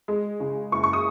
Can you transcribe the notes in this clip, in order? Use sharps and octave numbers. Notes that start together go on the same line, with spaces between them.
G#3
C#3
F#1 C#6
C#6
D#6